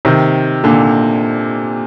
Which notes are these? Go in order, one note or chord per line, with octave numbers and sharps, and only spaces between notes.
C3 D#3
A#2 D3